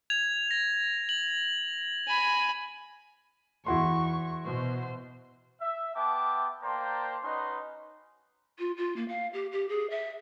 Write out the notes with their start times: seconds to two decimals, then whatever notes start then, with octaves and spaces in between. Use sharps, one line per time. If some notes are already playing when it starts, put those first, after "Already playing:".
0.10 G#6 F7
0.51 A#6
1.09 F#7
2.07 G#5 B5
3.66 E2 E4 F#4 C6 C#6
4.46 B2 C5
5.61 E5
5.95 B3 E5 G5 A5 D6
6.63 A#3 C5 D5 G5 A5 A#5
7.23 C#4 D#4 F#4 B4 D#5 C6
8.59 F4
8.77 F4
8.96 A#3
9.09 F5
9.33 G4
9.52 G4
9.69 G#4
9.90 E5